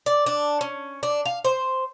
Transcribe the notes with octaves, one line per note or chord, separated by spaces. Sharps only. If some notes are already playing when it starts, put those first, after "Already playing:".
D5
D4
C#4
D4
F5
C5